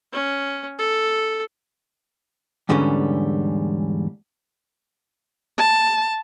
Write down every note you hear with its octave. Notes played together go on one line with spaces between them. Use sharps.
C#4
A4
E2 G#2 D3 E3 G3 C#4
A5